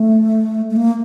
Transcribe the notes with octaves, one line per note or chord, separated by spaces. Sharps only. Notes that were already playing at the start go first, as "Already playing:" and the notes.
Already playing: A3
A3
A#3